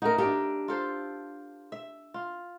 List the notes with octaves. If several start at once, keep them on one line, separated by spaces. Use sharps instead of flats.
A3 D#4 F#4 A#4
D4 G4 A4 A#4 E5
F4 A4 C5
E5
F4